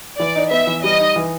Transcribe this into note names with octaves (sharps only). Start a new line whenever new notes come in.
E3 D5
D#4
B3 E5
E3
G3 D#5
D#4
E3